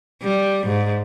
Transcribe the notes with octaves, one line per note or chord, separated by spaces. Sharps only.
G3
G#2